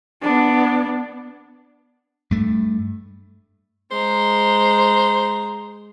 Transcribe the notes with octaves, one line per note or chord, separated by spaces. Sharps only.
B3 D4
G2 A3
G#3 C5 A#5